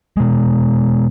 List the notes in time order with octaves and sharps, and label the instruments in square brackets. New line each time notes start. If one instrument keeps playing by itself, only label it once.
[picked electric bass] B2 G#3